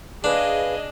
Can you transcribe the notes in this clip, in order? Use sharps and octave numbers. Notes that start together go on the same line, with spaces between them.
D4 G#4 B4 D#5 F5